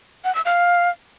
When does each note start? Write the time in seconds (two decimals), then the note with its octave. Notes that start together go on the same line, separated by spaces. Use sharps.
0.24 F#5
0.35 E6
0.45 F5